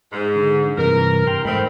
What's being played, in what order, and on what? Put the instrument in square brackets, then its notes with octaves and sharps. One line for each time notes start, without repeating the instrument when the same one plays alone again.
[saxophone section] G#2
[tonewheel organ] D3
[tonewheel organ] G2 C3 E3 [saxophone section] A#4
[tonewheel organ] G5 C6 F6
[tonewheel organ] G#2 A3 B5 [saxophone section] D#3 C4